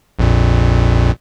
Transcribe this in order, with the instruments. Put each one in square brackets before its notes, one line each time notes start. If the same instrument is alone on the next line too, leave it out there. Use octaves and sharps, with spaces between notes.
[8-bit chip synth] A#1 F2 A#2